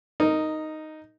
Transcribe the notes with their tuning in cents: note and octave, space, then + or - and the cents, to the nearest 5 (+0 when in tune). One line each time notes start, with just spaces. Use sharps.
D#4 +0 A#4 -20